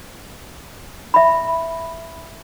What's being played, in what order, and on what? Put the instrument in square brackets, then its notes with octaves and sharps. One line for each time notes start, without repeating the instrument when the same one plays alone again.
[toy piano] E5 B5